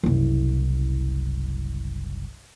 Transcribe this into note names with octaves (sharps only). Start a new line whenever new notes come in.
F#1 C2